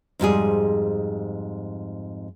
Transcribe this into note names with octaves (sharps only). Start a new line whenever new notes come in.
F2 G#2 G3 G#4